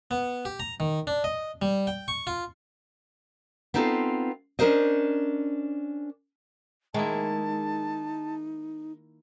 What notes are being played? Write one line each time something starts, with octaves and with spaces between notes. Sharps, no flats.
B3
G4
A#5
D#3
D4
D#5
G3
G5
C#6
F4
B3 C4 D#4 F4 G#4 A4
C#4 D4 E4 A#4 C5 D#5
D#3 G#3 A#3 D#4 E4 A5